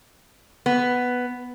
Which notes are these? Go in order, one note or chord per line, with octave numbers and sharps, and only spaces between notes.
B3